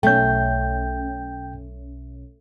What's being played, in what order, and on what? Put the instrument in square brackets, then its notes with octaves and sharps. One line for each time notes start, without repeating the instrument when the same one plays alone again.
[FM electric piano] B1 C#4 [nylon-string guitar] A3 [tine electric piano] G5 G6